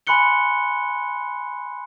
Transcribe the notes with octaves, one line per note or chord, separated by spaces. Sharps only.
G#5 B5 C6 F#6 C#7 G7